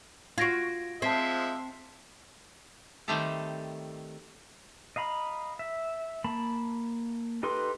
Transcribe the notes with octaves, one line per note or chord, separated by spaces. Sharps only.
F4 F#4 G#6 A#6 D7
F3 G#3 C4 E5 A5 C7
D#3 G3 A3 C4 G4 A4
D#5 F5 A#5 B5
E5
A#3 A5 B5
D#4 G4 A4 B4 C6